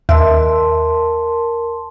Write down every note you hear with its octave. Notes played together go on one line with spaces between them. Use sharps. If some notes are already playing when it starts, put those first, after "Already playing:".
D#2 A#4 E5 A5 C6